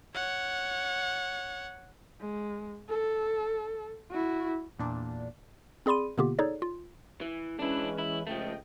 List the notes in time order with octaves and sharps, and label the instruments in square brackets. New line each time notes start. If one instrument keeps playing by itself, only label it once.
[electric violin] C#5 F#5
[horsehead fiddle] G#3
A4
E4 F#4
[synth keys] E2 A#2 D4
[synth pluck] C4 G#4 D5 B5 C6 D#7
B2 D3 A#3 B3 F4 G4
D#4 G#4 A4 C#5 D5
F4
[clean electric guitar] E3
[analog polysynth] E3 C#4 B4 [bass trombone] G#3 [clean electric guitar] D4 E4
[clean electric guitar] E4
[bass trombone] C#2 [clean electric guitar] F3 A3 [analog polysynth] D#5 G5